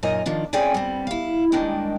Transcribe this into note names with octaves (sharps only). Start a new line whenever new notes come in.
F#2 A#2 D#4 A#4 D#5 G#5
D#3 F3 D4 F4
C4 C#4 G#4 D5 G5 G#5
G3 B3 C4
E4 F5
D#3 G3 G#3 A#3 D4 D#4